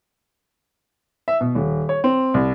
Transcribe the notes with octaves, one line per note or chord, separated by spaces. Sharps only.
E5
B2
D#1
C#5
C4
C2